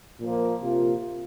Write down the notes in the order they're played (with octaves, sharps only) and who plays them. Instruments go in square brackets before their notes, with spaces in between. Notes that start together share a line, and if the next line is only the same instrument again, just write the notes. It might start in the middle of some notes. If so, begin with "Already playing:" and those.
[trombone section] A#2 F3 A#3
C3 A#3 F4